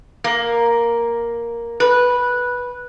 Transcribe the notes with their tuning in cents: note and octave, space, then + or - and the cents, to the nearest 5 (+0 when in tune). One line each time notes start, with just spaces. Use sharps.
A#3 +5
B4 -10